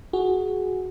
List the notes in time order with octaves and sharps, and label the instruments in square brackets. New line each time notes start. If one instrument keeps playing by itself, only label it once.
[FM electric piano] F#4 G#4